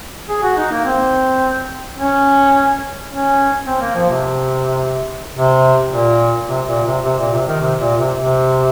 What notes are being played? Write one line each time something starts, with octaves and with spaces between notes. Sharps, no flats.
G#4
F#4
D#4
A#3
C4
C#4
C#4
C4
A#3
F3
C3
C3
A#2
C3
A#2
C3
C3
A#2
C3
D#3
C3
A#2
C3
C3